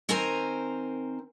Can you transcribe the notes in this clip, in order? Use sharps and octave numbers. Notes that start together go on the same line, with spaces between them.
D#3 C4 A#4 C5 G#5 A#5